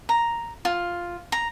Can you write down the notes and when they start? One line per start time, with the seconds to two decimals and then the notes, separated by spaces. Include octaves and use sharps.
0.09 A#5
0.65 F4
1.32 A#5